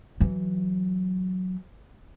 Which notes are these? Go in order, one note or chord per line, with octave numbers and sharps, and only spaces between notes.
E3 F#3